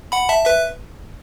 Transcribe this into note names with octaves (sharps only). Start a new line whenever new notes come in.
F#5 B5
E5 A5
B4 E5